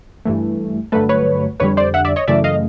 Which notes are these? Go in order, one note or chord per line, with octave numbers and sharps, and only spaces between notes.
G2 E3 A3
G2 D3 F#3 A3 A4 B4
B4 C#5
F2 D3 G3 B4 C#5
C5 D5
E5 F#5
D5 E5
C#5 D#5
F#2 C#3 E3 A3 D5 E5
D#5 F5